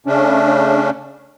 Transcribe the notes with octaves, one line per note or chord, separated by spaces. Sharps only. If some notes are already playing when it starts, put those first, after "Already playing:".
C#3 A3 C#4 D4